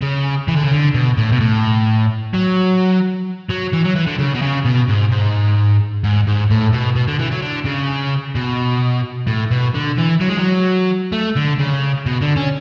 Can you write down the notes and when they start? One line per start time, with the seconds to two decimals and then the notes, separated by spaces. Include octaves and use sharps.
0.01 C#3
0.48 E3
0.56 D3
0.63 C#3
0.72 D3
0.94 B2
1.17 A2
1.32 B2
1.40 A2
2.33 F#3
3.49 F#3
3.72 E3
3.84 F#3
3.95 E3
4.07 D3
4.18 C#3
4.34 B2
4.42 C#3
4.65 B2
4.88 G#2
5.11 G#2
6.04 G#2
6.27 G#2
6.50 A2
6.73 B2
6.96 B2
7.08 D3
7.19 E3
7.31 F#3
7.42 D3
7.66 C#3
8.35 B2
9.27 A2
9.51 B2
9.74 D3
9.98 E3
10.20 F#3
10.29 G#3
10.37 F#3
11.13 A3
11.36 D3
11.59 C#3
12.06 B2
12.21 D3
12.36 C#4